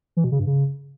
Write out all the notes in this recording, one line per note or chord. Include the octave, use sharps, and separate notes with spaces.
E3
B2
C#3
G2
C#3